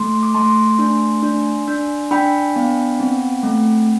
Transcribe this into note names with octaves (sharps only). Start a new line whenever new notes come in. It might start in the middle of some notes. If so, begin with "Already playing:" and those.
Already playing: A3 A5 C6
D6
A3 A5 C6
D4
D4
D4
D4 G5 B5
B3
C4
A3